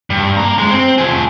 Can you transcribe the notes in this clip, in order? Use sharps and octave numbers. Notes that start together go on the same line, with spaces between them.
G2
A#3 A#5
F#2 G#3
C4
F3 G#4